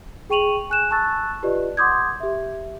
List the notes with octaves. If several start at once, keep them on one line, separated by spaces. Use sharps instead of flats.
G#4 G5 C#6 D#7 F7 F#7
G#5 F#6 E7
A5 C#6 E6 F#6 A6
F4 G4 B4 D5 D#5
F#5 C6 D6 D#6 G6 G#6
G4 E5